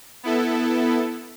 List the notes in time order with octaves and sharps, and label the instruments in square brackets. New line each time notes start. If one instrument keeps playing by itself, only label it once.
[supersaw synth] B3 E4 A4